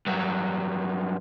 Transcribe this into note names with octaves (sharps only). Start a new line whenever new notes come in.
G2 F#3